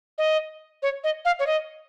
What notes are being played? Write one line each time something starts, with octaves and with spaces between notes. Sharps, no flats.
D#5
C#5
D#5
F5
C#5
D#5